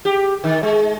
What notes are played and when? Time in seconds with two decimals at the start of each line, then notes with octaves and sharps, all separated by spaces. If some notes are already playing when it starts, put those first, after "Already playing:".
0.05 G4
0.44 D#3
0.63 G#3